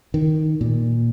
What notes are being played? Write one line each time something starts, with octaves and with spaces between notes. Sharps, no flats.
D#3
A#2